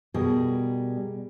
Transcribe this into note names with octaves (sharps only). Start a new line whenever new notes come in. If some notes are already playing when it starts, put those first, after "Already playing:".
B2 G3 G#4 A#4